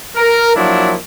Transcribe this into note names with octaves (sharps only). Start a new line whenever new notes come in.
A#4
F3 F#3 A#3 D4 E4